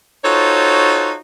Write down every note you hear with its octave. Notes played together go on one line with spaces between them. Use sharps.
D#4 F4 F#4 A4 C5 C#5